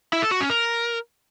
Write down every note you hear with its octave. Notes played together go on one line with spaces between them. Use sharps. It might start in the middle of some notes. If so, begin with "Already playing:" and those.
E4
A4
F#4
C#4
A#4